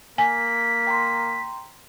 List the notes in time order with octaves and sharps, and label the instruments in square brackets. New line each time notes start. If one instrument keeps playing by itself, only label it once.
[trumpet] A#3 [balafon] G#5 [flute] B6
[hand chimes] G5 A#5 C6